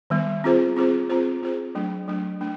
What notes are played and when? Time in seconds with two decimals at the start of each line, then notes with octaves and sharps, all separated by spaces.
0.10 D#3 G3 B3
0.44 C4 F4 G#4 C5
0.76 C4 F4 G#4 C5
1.10 C4 F4 G#4 C5
1.43 C4 F4 G#4 C5
1.75 F#3 A3 D4
2.08 F#3 A3 D4
2.41 A3 D4